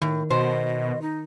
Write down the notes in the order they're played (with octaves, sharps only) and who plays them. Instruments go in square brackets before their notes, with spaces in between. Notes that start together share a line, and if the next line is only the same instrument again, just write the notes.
[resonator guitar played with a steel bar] A2 [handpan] D#3
[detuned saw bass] B2 [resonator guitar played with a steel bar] C5 [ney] D#5
[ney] D#4